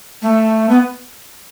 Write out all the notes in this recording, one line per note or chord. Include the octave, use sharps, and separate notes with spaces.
A3
B3